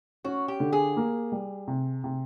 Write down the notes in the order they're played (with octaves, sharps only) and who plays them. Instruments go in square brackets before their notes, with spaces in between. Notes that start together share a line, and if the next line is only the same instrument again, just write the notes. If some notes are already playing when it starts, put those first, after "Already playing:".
[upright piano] C#4 [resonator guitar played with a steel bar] F#4
[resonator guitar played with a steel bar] G4
[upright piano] D3
[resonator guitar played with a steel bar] G#4
[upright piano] A#3
G3
C3
C3